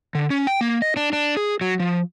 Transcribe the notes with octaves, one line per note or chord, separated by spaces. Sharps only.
D3
C#4
G5
A#3
D#5
D4
D4
G#4
F#3
F3